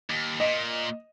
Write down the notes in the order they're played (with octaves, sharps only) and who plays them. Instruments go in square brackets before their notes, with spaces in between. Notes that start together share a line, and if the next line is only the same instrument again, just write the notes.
[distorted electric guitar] D#2
[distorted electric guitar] A#2 [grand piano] D#5